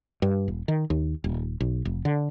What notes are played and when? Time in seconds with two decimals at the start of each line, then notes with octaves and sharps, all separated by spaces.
0.22 G2
0.48 E1
0.68 D#3
0.90 D#2
1.24 D#1
1.60 B1
1.85 F1
2.05 D3